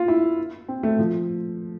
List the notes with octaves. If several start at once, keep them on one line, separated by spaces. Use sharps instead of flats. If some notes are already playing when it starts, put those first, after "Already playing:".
Already playing: F4
E4
C4
A3
F3